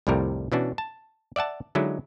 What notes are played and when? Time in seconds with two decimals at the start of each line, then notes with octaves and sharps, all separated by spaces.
0.07 C2 F2 A2 C3 G3 A#4
0.52 B2 E3 C#4 D4 F#4
0.78 A5
1.36 D5 E5 F#5 A5
1.75 D3 F#3 G#3 D#4 E4